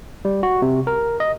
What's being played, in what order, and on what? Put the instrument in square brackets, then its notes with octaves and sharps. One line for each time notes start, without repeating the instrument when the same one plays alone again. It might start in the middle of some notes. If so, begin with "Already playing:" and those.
[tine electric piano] G3
F#4
C3
A#4
D#5